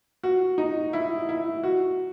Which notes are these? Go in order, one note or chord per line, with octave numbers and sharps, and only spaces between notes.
F#4
D#4
E4
E4
F#4